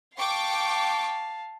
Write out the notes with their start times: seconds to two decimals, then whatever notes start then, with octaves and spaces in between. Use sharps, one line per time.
0.17 F5 G5 A5 C#6 D6